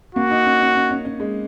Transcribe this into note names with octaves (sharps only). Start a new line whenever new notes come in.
A#3 F#4
D#4
C#4
C#4
C#4
C#4
C#4
G#3